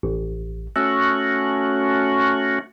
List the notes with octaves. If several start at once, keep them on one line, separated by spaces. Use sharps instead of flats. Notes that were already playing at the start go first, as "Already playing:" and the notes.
A1
A3 C#4 F#4 E6